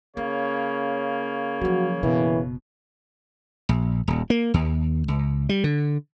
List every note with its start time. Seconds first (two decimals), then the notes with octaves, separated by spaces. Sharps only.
0.17 C#3 A#3 C#4 C#5
1.61 F3 F#3 F#4
2.03 F#1 B2 E3
3.69 A#1
4.08 D#1
4.30 A#3
4.54 D#2
5.08 C#2
5.49 G3
5.64 D3